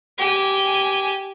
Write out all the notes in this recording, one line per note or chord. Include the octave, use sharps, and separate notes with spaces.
G4 G#5